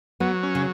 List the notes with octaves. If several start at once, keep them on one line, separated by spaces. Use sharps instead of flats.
F#3 B3
C#4
C#3